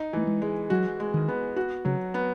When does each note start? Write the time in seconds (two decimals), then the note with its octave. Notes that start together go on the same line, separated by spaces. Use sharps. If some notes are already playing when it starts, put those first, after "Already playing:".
Already playing: D#4
0.13 E3 A3
0.27 G#3
0.42 G#3
0.70 F#3 F#4
1.00 G#3
1.14 D#3
1.28 B3
1.56 F#4
1.85 C#3 F#3
2.14 B3